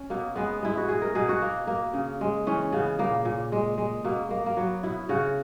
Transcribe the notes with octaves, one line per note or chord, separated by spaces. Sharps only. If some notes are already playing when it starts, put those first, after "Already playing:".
Already playing: C#4
B2 A#3
G#3 B3
G#3 E4
F#4
B2 G#4
A#4
B2 G#4
F#4
A#3
A#3
C#3
G#3
E3 C#4
C#3 B3
A#2 A#3
A#2
G#3
G#3
B2 A#3
A#3
A#3
F#3 B3
B2 E4
C#3 F#4